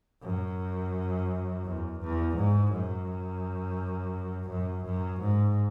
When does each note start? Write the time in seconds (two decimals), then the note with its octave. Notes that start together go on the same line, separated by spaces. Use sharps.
0.23 F#2
1.64 E2
2.00 E2
2.36 G#2
2.72 F#2
4.49 F#2
4.85 F#2
5.21 G#2